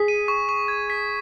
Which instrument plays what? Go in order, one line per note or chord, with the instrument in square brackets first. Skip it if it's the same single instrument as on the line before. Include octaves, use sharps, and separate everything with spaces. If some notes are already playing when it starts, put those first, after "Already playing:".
Already playing: [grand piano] G#4 [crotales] B6
[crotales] D#7
C#6
C#6
G#6
B6